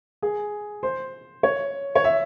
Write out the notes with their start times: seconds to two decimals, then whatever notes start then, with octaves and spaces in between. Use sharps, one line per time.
0.22 G#4
0.83 C5
1.43 C#5
1.95 C#5
2.04 E5